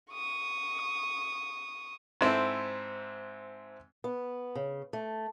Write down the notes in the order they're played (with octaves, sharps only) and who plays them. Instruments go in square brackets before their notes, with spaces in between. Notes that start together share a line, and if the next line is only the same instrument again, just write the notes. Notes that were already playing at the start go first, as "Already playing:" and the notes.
[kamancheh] C#6 D#6
[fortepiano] G#2 C4 E4 A4
[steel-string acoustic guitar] B3
C#3
A3